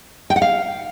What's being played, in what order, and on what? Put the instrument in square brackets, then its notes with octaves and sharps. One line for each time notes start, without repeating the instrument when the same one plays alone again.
[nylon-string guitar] G5
F#5
F5